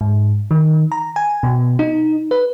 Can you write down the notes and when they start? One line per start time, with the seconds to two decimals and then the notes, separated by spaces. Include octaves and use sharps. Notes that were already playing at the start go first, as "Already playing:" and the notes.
0.01 G#2
0.51 D#3
0.92 A#5
1.16 G#5
1.43 B2
1.79 D#4
2.31 B4